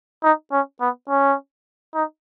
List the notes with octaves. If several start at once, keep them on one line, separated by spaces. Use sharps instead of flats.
D#4
C#4
B3
C#4
D#4